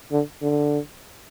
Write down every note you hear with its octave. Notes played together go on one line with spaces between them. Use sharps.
D3
D3